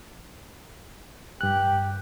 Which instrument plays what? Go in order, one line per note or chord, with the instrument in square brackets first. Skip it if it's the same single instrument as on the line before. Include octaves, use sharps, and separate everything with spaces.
[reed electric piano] G2 F#6 [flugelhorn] G4